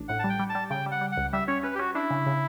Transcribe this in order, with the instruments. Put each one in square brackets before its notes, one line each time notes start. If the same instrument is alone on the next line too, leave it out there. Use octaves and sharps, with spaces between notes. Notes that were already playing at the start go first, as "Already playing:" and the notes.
Already playing: [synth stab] A1 D4
[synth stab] A2 [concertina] F#5
[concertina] A5
[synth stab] G3
[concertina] G5
[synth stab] G3
[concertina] A5
[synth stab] G3
[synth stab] C#3 [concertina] G5
[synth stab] G3
[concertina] F#5
[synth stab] G3
[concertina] F#5
[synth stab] C#2
[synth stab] G3 [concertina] E5
[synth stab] C#4 [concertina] C#5
[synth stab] C#4 [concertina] B4
[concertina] G4
[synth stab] C#4 [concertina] F#4
[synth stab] D4 [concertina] E4
[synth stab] C#3
C#3